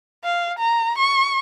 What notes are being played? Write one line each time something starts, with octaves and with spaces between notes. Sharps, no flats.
F5
A#5
C#6